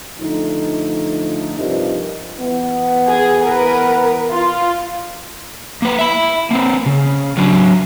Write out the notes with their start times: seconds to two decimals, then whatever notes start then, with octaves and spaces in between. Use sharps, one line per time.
0.20 D3 F3 A3 D#4
1.57 G2 C3 F3 G3 A#4 D#5
2.40 E3 B3
3.09 G#4
3.46 A#4 B4
4.30 F4
5.82 A#3 B4
5.99 E5 B5
6.51 A#3 C4
6.86 C#3
7.37 F#3 D4